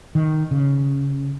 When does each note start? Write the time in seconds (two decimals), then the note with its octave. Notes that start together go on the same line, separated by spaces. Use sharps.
0.15 D#3
0.51 C#3